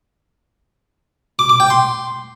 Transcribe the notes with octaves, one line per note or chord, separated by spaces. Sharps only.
D6
D6
G5
C6